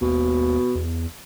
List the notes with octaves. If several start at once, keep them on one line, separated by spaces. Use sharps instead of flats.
D#2 B2
E2